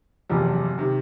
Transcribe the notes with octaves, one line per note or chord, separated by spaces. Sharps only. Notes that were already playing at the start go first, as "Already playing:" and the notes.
F#1 E2 C3 F3
C3 D#3